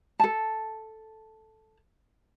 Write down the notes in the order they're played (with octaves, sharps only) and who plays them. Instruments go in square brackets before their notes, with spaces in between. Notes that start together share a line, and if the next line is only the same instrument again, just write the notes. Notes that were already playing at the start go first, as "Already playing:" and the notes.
[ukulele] A4 A5